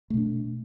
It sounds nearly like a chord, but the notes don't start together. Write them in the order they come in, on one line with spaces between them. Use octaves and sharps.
A3 B2 D4